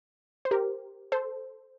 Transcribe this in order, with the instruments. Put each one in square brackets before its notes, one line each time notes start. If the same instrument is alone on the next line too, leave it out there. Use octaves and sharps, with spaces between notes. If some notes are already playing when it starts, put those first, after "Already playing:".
[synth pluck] C5
G4 A#4
A4 C5